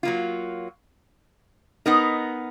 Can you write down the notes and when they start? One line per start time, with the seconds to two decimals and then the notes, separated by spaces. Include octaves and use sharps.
0.03 F#3 A#3 F4
1.86 B3 D#4 A#4 D#5